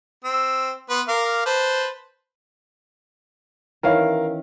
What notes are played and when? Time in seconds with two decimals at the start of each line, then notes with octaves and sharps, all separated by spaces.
0.24 C4 E6
0.90 B3 B4 C6
1.08 A#4 F5 D6
1.46 B4 C5 A5
3.83 D#3 E3 C#4 A#4 F5